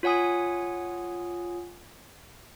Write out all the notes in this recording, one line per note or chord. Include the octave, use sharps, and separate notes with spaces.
F4 C#5 F#5 G#5 D#6